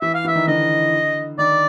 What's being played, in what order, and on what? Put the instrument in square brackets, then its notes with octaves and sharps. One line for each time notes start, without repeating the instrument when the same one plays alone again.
[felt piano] E3 [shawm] E5
[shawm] F5
[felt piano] E3
[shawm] E5
[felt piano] D#3
[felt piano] D3 [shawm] D#5
[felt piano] D#3 [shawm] D5